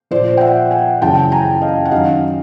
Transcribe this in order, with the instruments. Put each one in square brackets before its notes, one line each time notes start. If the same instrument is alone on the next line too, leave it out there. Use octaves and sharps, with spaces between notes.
[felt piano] A#2 F3 C5 D5
G5
E5 F#5
F#5 G#5
F#2 C#3 E3 G5 A5
G#5 A#5
D#5 F5
F#5
F#2 D#3 F#3 D#5 F5